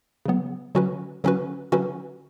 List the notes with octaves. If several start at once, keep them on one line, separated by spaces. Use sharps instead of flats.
C#3 F#3 B3
D3 F#3 C#4 F#4 B4
D3 F#3 C#4 F#4 B4
D3 F#3 C#4 F#4 B4